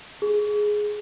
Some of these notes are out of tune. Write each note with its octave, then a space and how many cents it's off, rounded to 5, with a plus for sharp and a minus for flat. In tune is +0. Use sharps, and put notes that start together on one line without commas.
G#4 +10